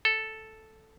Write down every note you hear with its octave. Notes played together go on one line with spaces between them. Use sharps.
A4